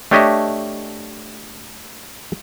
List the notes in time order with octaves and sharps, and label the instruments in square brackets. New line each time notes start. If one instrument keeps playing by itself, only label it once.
[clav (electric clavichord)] A3 D4 G4 C#5 D#5 E5